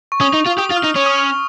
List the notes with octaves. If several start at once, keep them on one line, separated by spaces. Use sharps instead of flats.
C#6
C#4 D#6
D#4
F4
G4 D#6
F4
F6
D#4
C#4 C#6
D#6
C#6